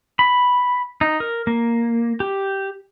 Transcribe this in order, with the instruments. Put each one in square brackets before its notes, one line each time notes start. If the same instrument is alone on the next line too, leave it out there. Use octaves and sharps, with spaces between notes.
[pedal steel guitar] B5
D#4
A#4
A#3
G4